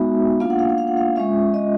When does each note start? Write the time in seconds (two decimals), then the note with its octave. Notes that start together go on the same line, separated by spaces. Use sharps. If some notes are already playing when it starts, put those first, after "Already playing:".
Already playing: G#3 B3 D#4 F#4 E5
0.40 A#3 D4 F4 F5
0.50 F#5
0.59 F5
0.69 F#5
0.78 F5
0.87 F#5
0.97 F5
1.16 G#3 C#4 F4 E5
1.54 D#5